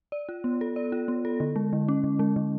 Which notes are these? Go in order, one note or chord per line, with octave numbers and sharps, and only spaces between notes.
D5
F4
B3
A4
D5
F4
B3
A4
D3
G#3
D3
C#4
D3
G#3
D3